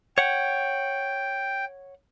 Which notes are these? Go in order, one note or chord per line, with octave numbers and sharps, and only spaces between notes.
C#5 F#5 G5